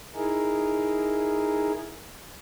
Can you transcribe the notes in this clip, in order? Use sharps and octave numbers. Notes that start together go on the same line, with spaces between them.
D#4 E4 G#4 A#4